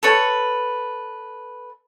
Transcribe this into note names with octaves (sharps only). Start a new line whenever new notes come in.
A4 B4 C#5